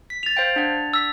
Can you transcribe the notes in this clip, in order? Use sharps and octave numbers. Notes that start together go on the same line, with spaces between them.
B6
A6 F7
C5 F5 G5
D4 F#5
E6 B6